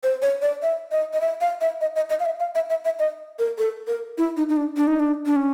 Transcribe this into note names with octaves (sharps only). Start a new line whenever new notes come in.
C5
C#5
D5
E5
D#5
D#5
E5
F5
E5
D#5
D#5
D#5
F5
E5
F5
E5
E5
E5
D#5
A#4
A4
A#4
E4
D#4
D#4
D4
D4
D#4
D4
D4
C#4